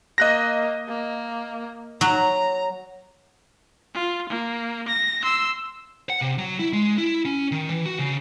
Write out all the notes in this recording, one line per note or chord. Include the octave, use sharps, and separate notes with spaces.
A#3 D#5 F#6 A#6
A#3
F#3 A#5
F4
A#3
A#6
C6 E6
F#5
C3
F#3
E4
G#3
E4
C#4
D#3
E3
F#4
C#3